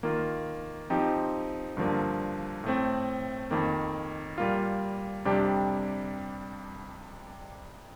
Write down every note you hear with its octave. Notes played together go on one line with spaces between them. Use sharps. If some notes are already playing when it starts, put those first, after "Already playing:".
D#3 A#3 F4
F3 C4 D#4 G4
G2 D3 F3 A#3
A2 A3 C4
F2 D#3 A#3
A#2 G3 A#3 F4
F2 C3 G3 D4 G4